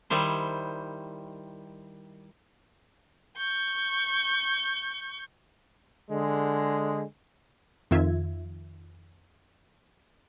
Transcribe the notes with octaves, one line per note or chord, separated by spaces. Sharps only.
D#3 G3 E4 C5
C#6 G6
D3 G#3
F2 D#3 F4 E5 G#6